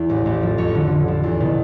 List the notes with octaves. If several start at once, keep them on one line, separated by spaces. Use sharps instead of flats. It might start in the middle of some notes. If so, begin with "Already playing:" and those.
Already playing: E2
A1
A1
F3
F2 C#5
D3
D3
F3
E2
B2